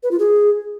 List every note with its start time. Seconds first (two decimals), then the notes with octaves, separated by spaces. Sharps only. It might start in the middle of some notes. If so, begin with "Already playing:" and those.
0.03 B4
0.11 F4
0.19 G#4